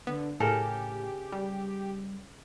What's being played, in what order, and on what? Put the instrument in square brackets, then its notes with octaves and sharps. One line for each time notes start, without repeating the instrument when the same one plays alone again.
[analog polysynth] D3 [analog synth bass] B3
[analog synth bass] A2 [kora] C#3 A4 A#4 [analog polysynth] G4
[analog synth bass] G3